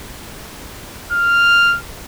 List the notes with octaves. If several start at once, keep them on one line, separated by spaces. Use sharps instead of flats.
F6